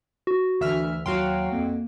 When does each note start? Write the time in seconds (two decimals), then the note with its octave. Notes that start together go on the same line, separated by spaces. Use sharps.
0.27 F#4
0.61 D2 E3 E5 F6
1.06 D#2 F#3 F#4 F5 G5 C6
1.52 F2 A#3